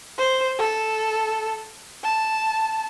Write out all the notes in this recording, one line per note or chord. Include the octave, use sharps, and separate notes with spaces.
C5
A4
A5